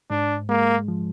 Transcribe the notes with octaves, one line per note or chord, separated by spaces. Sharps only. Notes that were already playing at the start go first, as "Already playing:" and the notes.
G#2 D4
G#3 A#3
F3